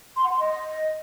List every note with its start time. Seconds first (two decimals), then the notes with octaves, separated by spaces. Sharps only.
0.16 C6
0.24 F#5
0.32 C6
0.40 D#5